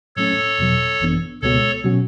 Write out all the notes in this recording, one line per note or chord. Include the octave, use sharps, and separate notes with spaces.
A2 F#3 A3 C#4 A4 C#5
E2 B2 F#3
G#1 F#2 E3 B3 D4
C#2 B2 G#3 B3 F#4 A4 C#5
B2 F#3 C#4 F#4